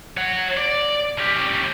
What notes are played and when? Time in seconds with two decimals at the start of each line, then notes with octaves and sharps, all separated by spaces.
0.17 C#5 F#5
0.57 D5
1.18 C#4 G4